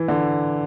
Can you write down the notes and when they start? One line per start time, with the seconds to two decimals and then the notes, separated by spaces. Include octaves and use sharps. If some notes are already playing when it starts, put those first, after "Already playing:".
Already playing: E3
0.08 D3